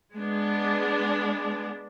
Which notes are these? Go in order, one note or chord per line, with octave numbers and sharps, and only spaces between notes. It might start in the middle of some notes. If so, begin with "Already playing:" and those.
G#3 B3 D4